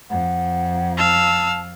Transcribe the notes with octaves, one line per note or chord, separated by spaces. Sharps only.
F2 F#5
F5 A5 E6